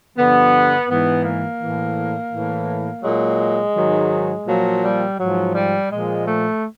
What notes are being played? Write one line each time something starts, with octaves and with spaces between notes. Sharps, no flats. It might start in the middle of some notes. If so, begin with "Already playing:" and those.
G2 D3 F3 B3
G#2 E3 B3
A#3
A2 E3
A2 E3
A#2 F#3 G#3
G#2 D#3 F#3
A#2 F3 F#3
G3
G#2 F3 F#3
G3
A#2 F3 G#3
A3